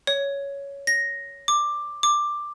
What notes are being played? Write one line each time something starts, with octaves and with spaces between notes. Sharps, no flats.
C#5
A#6
D6
D6